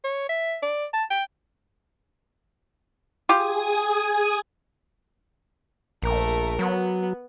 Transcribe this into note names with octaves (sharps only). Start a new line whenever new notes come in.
C#5
E5
D5
A5
G5
F4 G4 G#4 G#5 D#6
A#1 A3 A#4
F#3 B3